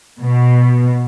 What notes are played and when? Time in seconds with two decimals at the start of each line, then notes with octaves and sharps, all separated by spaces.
0.20 B2